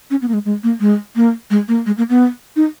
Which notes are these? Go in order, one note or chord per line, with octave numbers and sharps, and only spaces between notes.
C#4
B3
A#3
G#3
G#3
A#3
G#3
A#3
G#3
A#3
G#3
A#3
B3
D#4